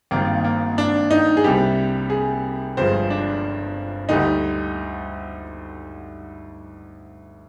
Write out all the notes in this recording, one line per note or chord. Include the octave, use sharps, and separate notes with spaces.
G#1 G2 D#3 A#3
A#3
D4
D#4
G#4
C2 C3 G3 G4
G#4
G1 G2 F3 G#3 C5
D4
D2 D3 G3 D#4